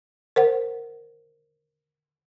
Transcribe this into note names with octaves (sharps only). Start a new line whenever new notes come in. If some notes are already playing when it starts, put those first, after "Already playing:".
A#4 C5 F#5